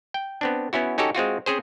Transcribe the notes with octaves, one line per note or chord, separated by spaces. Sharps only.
G5
B3 C4 D4
B3 C#4 E4 F#4
C#4 D#4 F#4 G4 A4 C#5
G#3 C4 F4 F#4
C4 C#4 G#4 C5